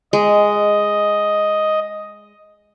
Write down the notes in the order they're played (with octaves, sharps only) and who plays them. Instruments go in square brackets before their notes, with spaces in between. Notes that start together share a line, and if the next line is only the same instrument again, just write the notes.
[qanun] G#3 [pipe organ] D#5